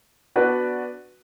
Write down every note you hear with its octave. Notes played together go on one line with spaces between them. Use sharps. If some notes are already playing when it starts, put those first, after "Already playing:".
B3 D4 F#4 B4 D5